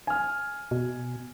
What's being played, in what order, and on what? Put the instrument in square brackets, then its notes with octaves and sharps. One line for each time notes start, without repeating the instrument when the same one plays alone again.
[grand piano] G#5 F6
[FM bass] B2